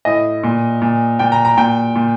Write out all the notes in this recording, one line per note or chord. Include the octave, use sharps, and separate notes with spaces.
A2 D#5
A#2
A#2
A#2 G5
A#5
A#5
A#2 G5
A#2